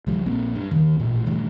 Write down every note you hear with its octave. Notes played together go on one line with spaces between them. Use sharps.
C#2 F3 G3
A#1 A#3 C4
G2
D#2 D#3
A1 A#2
D#1 G2 E3 A3